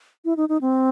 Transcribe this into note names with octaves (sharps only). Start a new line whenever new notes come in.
E4
D#4
D#4
C4